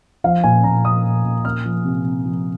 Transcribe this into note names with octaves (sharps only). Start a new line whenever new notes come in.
F3 F5
A#2 G#5
A#2 A#5
F3 D#6
A#2
A#2
A#3 F6
F3
C3
C3
F3